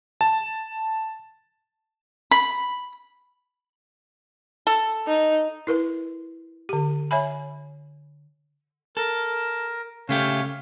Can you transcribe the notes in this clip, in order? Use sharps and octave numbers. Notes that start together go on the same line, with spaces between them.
A5
B5
A4
D#4
E4 A#4 B4
D3 G4
C#5 E5 G#5 B5
A4 A#4
C#3 A3 G4 C#5 F5